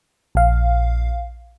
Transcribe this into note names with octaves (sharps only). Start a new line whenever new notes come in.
A#1 F5